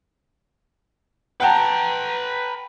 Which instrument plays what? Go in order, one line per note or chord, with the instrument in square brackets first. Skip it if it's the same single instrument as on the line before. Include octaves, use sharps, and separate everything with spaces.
[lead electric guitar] B4 A#5 [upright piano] F#5 G5 A5